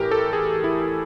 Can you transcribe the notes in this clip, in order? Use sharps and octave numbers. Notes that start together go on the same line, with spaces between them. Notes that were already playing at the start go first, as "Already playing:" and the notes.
Already playing: A2 E3 G4 A#4
A4
G#4
E4